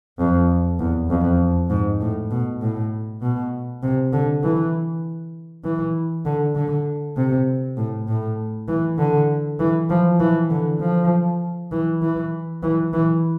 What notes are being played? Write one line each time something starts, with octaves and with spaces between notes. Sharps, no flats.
F2
E2
F2
G#2
A2
B2
A2
B2
C3
D3
E3
E3
D3
D3
C3
A2
A2
E3
D3
E3
F3
E3
D3
F3
E3
E3
E3
E3